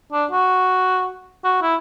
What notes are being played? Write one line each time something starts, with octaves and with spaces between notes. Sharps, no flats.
D4
F#4
F#4
E4